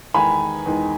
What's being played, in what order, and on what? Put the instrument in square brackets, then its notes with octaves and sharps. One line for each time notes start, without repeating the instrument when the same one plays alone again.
[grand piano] E2 D#3 G#3 D#4 [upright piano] G#5 B5
[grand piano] E2 D#3 G#3 D#4